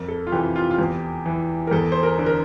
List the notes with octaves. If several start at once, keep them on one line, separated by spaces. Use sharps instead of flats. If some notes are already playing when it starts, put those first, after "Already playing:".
Already playing: F2 A#4
A4
F4
C3 E3 G4
F4
F4
E2 G4
E3
A#4
E2 A4
C5
A#4
D3
A#4